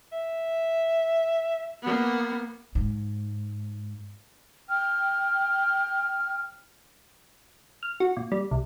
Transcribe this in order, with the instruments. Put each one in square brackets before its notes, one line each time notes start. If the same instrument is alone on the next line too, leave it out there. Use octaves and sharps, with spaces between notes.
[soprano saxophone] E5
[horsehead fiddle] A#3 B3
[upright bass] G#2
[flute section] G5 F6
[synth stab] F6
F#4
A#2
G3
C2